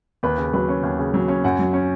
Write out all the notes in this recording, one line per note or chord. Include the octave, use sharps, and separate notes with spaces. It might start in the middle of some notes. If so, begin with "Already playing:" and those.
D#2 B4
C#3
F#3 B4
C#4
D#2
C#3
F#3
C#4
F#2 F#5
F#3
C#4